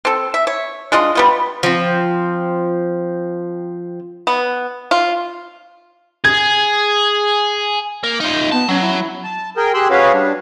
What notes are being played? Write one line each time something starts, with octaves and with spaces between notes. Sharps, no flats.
C4 A4
E5
C#5
G#3 D4 F4 D#5
G3 B3 F4
F3 C4
B3
F4
G#4 G#6
A#3
D#4 F4
B3 A5
F#3 C#4
E4
A5
G#4 A#4 G5
G4 G#4 C6 E6 F#6
C#4 F#4 G#4 B4 C#5 F5
G3 D4